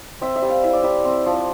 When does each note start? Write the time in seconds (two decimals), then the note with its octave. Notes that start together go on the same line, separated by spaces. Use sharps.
0.21 C4 E5
0.36 E5
0.42 G3
0.50 F5
0.63 E4 E5
0.73 D5
0.84 G3 E5
1.05 C4
1.26 F3